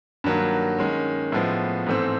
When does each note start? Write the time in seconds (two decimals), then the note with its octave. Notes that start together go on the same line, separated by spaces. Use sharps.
0.24 G2 D#3 F#3 A#3
0.79 D#3 G#3 C#4
1.32 A2 F3 G#3 B3
1.86 G#2 E3 A3 C4